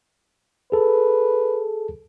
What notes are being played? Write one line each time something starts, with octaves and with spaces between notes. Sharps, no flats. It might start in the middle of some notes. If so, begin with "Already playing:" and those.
G#4 A4 B4